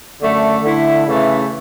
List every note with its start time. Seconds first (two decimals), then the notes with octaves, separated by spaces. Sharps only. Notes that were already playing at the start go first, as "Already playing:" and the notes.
0.21 F#2 D3 A3
0.63 D3 A3 E4
1.06 C#3 E3 A3